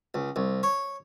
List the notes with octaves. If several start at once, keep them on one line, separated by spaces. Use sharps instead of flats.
C#2
C2
C#5